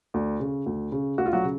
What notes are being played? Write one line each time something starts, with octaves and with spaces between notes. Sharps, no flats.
D2
C#3
D2
C#3
D2 F#4
F4
F#3 F#4
C#3